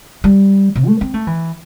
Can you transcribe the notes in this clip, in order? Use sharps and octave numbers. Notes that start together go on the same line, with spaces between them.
G3
C3
A3
C4
A3
E3